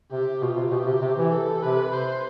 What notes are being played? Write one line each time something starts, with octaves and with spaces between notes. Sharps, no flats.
C3 G4
B2 F4
C3
B2 G4
C3
C3
E3
A4
C3 B4
C5